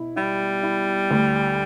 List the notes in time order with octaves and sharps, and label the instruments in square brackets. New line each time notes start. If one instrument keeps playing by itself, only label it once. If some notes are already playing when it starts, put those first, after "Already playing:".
Already playing: [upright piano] B2 E4
[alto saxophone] G3 [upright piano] E4
[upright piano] E4
D2